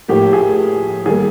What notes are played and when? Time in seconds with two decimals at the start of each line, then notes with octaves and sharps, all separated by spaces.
0.08 A2 F3 A#3 G4
0.33 G#4
1.06 D#3 G3 A#3 G#4